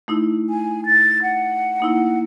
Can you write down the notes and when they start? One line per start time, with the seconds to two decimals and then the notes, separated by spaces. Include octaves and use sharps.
0.08 A3 D#4 E4
0.50 G#5
0.86 A6
1.22 F#5
1.80 A#3 D#4 E4